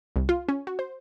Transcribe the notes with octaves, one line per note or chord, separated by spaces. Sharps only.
C2
F4
C#4
F#4
C5